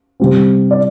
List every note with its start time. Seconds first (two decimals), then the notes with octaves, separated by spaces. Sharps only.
0.20 C3 G3 C4
0.71 D5